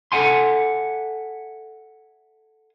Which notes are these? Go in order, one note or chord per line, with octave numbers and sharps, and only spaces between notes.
A4 A#4 E5 F#5 G#5 C6